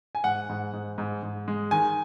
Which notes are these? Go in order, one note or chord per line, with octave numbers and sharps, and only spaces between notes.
G#5
G#2 F#5
G#2
G#2
G#2
G#2
G#3
D#3 G#5